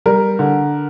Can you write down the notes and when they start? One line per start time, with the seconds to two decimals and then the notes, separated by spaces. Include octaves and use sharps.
0.06 G3 A#4
0.39 D3